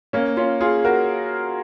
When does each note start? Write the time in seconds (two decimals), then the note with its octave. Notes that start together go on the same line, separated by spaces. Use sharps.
0.13 A#3 C#4
0.37 C#4 F4
0.61 F4 G#4
0.84 F#4 A#4